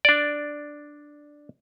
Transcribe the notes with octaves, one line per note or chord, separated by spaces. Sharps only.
D4 D5